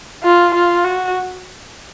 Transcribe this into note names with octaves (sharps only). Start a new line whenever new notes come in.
F4
F4
F#4